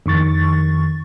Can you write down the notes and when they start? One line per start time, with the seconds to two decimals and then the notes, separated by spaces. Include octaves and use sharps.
0.06 F2 D#3 C#6 A6